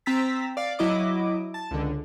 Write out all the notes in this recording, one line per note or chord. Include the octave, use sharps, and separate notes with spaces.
C4 A#5 E6 A6 B6
D5 F5
F#3 E4 D#5 D6
A5
C#2 D3